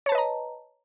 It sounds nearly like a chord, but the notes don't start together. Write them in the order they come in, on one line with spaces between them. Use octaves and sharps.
C#5 A5 B4 D#5 A#5